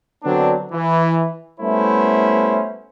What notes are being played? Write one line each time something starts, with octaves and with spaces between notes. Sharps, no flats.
D3 F#3 B3 C4 D4
E3
G3 A3 B3 C#4 E4 C5